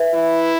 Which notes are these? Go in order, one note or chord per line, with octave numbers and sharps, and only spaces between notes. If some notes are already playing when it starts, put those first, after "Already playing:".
Already playing: B4 E5
E4